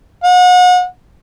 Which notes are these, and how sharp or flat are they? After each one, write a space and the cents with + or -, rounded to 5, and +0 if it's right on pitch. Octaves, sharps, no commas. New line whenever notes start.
F#5 -35